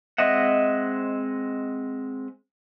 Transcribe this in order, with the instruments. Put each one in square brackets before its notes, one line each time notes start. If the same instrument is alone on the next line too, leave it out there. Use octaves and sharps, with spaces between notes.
[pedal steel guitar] G#3 C4 D#5 E5 F#5